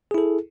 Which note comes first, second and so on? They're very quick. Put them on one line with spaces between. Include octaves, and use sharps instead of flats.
G#4 E4 A4